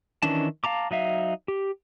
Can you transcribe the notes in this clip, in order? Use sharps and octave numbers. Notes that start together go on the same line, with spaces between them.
D#3 E3 C#4 D4 A5
F5 A5 A#5 D6
F#3 D#4 E5 F5
G4